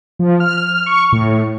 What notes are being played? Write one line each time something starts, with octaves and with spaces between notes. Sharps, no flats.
F3
F6
C#6
A2